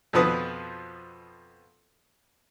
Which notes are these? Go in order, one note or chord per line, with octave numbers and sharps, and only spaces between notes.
F2 B2 F3 B4 D#6